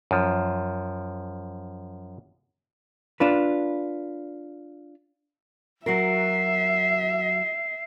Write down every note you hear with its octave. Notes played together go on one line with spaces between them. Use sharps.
F#2 F3
D4 F4 B4
F#3 F#4 A#4 E5 C7